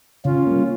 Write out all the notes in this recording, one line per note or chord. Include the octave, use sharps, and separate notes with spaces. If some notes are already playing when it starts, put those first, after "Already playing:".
C#3 C#4 F4
G3 A#3